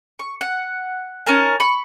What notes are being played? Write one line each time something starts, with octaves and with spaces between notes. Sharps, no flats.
C#6
F#5
C#4 D#4 A#4 A5
B5 C#6